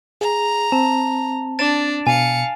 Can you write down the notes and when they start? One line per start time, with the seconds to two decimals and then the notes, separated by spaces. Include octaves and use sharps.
0.21 G#4 A#5
0.72 C4 A5
1.59 D4 A6 D7 E7
2.07 B2 F5 G#5 C#7